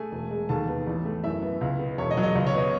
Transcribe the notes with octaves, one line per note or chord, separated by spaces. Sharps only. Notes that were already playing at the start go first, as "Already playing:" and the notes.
Already playing: A3 G#4 G#5
E1
G#3
D#2 A4 A5
B3
A1
A3
F#2 E4 E5
B3
C#2
B3
E1 C#5
D#5
F#3
D#5
C#2 D#5
C#5
B3 D#5